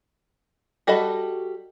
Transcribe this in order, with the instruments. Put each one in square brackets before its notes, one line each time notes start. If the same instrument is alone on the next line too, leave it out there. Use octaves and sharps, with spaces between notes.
[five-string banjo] G3 F#4 A4 D#5 B5